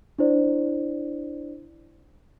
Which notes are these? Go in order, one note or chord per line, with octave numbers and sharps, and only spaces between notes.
D4 E4 C5 D5